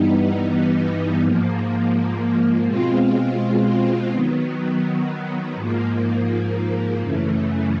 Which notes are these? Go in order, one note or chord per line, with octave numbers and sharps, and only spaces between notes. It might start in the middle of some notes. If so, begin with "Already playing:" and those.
Already playing: G2 E3 G3 B3 D#4
G#2 F3 A#3
B2 G#3 C4 F4
D#3 F#3 B3
G#2 F3 A#3
F#2 C#3 E3 A3